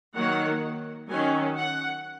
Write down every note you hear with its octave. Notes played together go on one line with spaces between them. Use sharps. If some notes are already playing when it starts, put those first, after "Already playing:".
D#3 F#3 A#3 F#5
D#3 F#3 C#4 G#5
F#5